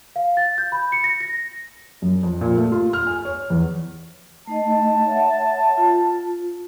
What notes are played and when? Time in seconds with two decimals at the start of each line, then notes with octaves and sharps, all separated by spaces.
0.16 F5
0.37 A6
0.58 G6
0.72 B5
0.92 C#7
1.04 A#6
1.20 A#6
2.02 F#2
2.23 F2
2.41 A#2
2.57 A3
2.72 F4
2.93 F6
3.07 G#5
3.25 C#5
3.50 E2
4.47 A3 D#4 D#5 A5
5.07 C#5 E5 F#5
5.77 F4